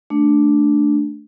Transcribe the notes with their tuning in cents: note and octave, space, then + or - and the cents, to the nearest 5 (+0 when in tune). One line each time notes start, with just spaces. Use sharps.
A3 -5 D4 +0